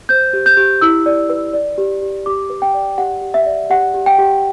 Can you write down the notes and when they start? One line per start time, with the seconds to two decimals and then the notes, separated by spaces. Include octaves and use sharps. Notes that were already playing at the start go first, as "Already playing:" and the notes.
0.09 C5 G6
0.33 G4
0.46 G6
0.57 G4
0.81 E4 E6
1.06 D5
1.30 B4
1.53 D5
1.78 G4
2.02 G4
2.26 G4 D6
2.50 B4
2.62 G5
2.74 D5
2.98 G4 F#5
3.22 G4
3.34 E5
3.46 D5
3.70 G4 F#5
3.94 G4
4.06 G5
4.19 G4